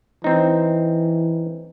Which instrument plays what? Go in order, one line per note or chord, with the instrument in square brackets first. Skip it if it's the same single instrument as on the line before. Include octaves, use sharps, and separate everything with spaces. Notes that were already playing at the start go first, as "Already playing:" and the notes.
[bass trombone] E3 [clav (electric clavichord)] C4 D#4